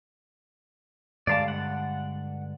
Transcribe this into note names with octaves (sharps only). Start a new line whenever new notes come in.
G2 D3 G#3 D5 F5 A5
F#5